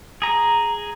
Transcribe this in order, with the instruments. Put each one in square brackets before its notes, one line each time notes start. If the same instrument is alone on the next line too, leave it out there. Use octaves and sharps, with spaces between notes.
[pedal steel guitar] G#4 A#5